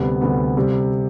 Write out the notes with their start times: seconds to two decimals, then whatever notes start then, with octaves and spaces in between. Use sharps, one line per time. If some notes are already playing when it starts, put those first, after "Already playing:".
Already playing: D2 C3 G3 B3
0.21 D2 C3 G3 B3
0.57 C3 G3